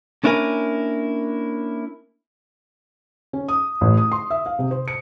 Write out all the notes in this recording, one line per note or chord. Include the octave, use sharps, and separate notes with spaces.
A#3 C#4 D4 E4 A#4 G#5
C#4
D#6
A1
D#6
C6
E5
F5
C3
C5
C#7